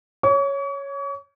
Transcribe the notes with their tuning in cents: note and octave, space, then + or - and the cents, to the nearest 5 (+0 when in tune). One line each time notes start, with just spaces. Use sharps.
C#5 +0 C#6 +40